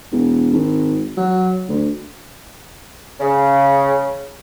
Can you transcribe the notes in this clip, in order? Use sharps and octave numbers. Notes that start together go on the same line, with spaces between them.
E1
G#1
F#3
D2
C#3